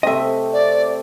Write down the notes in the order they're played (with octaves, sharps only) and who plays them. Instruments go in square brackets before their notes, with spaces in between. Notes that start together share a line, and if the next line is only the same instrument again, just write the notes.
[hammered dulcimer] C3 A3 C4 [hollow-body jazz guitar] D#5 E5
[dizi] D5